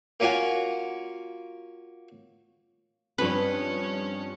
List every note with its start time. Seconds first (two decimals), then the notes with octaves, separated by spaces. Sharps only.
0.20 A#3 C#4 F4 F#4 G#5
3.18 G2 F3 C4 C#4 B4 C#5